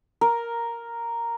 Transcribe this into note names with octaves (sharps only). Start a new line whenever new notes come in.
A#4